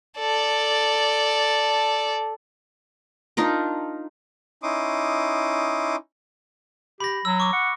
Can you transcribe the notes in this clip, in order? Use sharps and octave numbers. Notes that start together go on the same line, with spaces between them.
A4 D5
D4 D#4 F4 A#4
C#4 D#4 E4 C6 D6 D#6
G4 B5 A#6
F#3 E6
C#6 D6
F#5